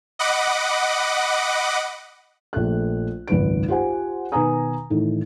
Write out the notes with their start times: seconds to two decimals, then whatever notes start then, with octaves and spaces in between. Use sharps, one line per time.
0.19 D#5 F#5 B5 D6
2.53 A#1 A3 A4 F#6
3.28 G#1 C#2 F#2 D#3 B4 D7
3.68 F4 G4 C5 F#5 G#5
4.32 B2 D#3 B4 G#5 A#5 D#6
4.90 A2 D#3 E3